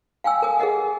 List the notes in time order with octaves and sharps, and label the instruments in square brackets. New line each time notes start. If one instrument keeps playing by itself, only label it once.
[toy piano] F5 G5 G#5 E6
A#4 G#5 D#6
G#4 A#4 D#5 F#5